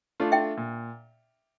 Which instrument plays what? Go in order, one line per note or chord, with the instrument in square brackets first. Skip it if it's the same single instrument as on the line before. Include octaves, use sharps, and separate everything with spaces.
[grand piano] A3 D4 F4
[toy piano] E5 G5
[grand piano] A#2